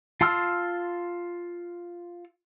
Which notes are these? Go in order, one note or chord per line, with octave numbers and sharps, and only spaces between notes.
F4 A5 C6 E6 F6